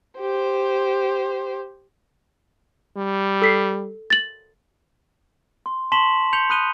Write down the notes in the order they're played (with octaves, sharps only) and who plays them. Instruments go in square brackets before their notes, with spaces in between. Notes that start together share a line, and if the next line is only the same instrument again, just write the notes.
[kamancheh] G4 C5
[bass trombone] G3
[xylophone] A4 B6 C7
A6 F#7
[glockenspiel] C6
A5 C6 C#6 B6 E7 F#7
C6 G6 C#7 F7
B5 D#6 F#6 D#7 G7